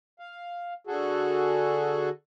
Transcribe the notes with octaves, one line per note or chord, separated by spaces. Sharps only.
F5
D3 F#4 G#4 A4